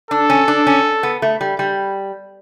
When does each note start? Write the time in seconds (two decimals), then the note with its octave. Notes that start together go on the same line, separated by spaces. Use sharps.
0.11 D4 A4
0.30 C#4
0.48 D4
0.67 C#4
1.03 B3
1.22 A3
1.41 G3
1.59 G3